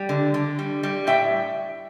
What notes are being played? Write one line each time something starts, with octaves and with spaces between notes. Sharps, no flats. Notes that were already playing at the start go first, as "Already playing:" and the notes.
Already playing: G3
D3
D3
G3
G3
A2 E5 G5